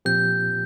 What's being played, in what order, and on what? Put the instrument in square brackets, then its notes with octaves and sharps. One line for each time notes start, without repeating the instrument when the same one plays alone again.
[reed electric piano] A#2 F3 C4 G4 [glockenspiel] G6